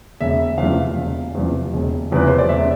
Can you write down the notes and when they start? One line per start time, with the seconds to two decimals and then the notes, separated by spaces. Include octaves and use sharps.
0.21 E1 E5
0.58 E2 C3 F3 F5
0.97 E1
1.35 E2 C3 F3
1.73 E1
2.12 E2 C3 F3 B4
2.27 C5
2.38 D5
2.49 E1 E5